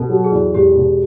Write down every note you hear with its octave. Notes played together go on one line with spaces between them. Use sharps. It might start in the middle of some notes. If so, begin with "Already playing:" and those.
Already playing: B2 A4
F#3
G#4
E2
E1 G4
B2